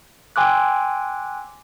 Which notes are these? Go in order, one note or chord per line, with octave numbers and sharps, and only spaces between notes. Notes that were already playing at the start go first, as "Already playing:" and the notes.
G5 G#5 C6 D6 E6 F#6